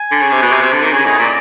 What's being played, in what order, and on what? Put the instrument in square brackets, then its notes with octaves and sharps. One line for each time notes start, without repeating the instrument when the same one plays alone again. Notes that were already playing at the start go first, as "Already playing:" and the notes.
Already playing: [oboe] G#5
[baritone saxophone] D3
C#3
C3
B2
C3
C3
D3
D#3
[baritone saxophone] C#3 [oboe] G#5
[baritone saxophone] A2 [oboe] D#5
[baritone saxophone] A#2 [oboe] D5